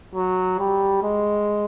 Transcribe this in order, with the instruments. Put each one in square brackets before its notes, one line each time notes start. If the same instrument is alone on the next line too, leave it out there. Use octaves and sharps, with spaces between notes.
[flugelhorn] F#3
G3
G#3